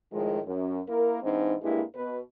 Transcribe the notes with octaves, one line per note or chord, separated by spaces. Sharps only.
A2 D#3 F3 G#3
F#2
A#3 E4 A#4
G#2 E3 C4 D4 D#4
G2 G3 G#3 A#3 E4
B2 B4